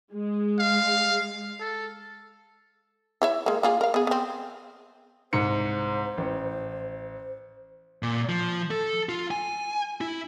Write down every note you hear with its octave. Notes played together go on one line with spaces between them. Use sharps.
G#3
F5
A4
E4 C#5 E5
G#3 A#3
A#3 F4 G#4
A#4 F5
B3 G#4
B3 C4
C2 G#2 C5 C#7
A1
A#2
F3
A4
F4
G#5
E4